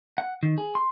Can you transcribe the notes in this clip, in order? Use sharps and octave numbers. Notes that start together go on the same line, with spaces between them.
F#5
D#3
G#4
C6